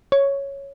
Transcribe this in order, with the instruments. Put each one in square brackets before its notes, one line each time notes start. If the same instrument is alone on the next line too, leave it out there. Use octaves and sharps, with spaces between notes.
[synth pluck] C#5